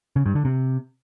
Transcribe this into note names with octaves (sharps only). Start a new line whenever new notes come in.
C#3
G2
D3
C3